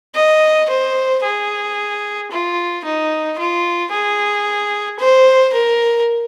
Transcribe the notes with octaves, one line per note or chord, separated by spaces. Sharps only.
D#5
C5
G#4
F4
D#4
F4
G#4
C5
A#4